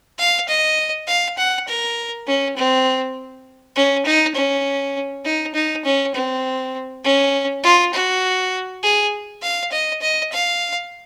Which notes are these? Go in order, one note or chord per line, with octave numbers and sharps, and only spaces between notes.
F5
D#5
F5
F#5
A#4
C#4
C4
C#4
D#4
C#4
D#4
D#4
C#4
C4
C#4
F4
F#4
G#4
F5
D#5
D#5
F5